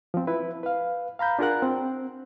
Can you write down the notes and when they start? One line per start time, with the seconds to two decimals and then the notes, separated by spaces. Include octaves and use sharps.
0.14 F3 C4
0.27 E4 B4
0.63 B4 F5
1.19 F5 A#5 B5 G6
1.39 D4 F4 G#4 A#4 F#5 F#6
1.62 C4